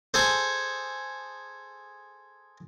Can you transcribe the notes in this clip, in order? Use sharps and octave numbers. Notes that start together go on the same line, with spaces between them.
G#4 A4 C5